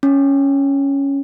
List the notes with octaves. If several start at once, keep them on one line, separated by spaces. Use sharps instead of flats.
C#4